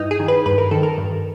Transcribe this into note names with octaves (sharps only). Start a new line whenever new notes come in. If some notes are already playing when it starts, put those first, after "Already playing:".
Already playing: G2 D#4 E4
G#4
D#3
B4
G2 B4
A#4
D#3 A4
A#4
G2